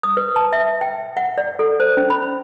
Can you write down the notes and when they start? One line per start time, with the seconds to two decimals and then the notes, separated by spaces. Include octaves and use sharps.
0.03 D#6
0.17 B4
0.36 A5
0.53 E5
0.81 G5
1.17 F#5
1.38 D5
1.59 A4
1.80 C5
1.97 C#4
2.10 B5